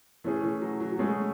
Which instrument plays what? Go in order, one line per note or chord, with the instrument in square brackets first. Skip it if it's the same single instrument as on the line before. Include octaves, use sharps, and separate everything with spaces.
[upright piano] E3 [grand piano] A3 C#4 G#4
[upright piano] E3
F#3
F#3
F#3
[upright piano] G#3 [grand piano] A3 C#4 G#4